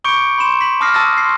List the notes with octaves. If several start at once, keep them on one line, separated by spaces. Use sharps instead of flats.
B5 C#6 D6 G6 C#7 D7
B5 C6 E7
B6 F#7
A5 D6 D#6 F6 A#6 C7
A5 D#6 E6 A6 A#6
C6 F6 C7